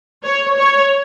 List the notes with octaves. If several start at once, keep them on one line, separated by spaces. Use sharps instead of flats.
C#5
C#5